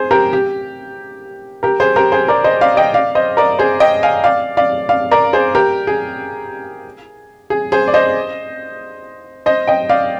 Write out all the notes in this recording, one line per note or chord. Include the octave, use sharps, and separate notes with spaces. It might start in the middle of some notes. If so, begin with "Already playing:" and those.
Already playing: G#4 C5
G4 A#4
G4
G4 A#4
G#4 C5
G4 A#4
G#4 C5
A#4 D5
C5 D#5
D5 F5
D#5 G5
D5 F5
C5 D#5
A#4 D5
G#4 C5
D#5 G5
F5 G#5
D5 F5
D5 F5
D5 F5
A#4 D5
G#4 C5
G4 A#4
G#4
G#4
G#4 C5
D5
C5 D#5
C5 D#5
D#5 G5
D5 F5